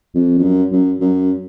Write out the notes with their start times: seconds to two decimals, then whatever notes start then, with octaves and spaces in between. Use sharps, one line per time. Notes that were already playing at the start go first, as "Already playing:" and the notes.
0.15 F2
0.39 F2
0.43 F#2
0.72 F#2
1.01 F#2